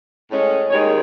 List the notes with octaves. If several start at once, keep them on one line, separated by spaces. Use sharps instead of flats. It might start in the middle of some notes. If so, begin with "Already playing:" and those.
A2 G#3 C#4
D#2 D#3 G#3 C#5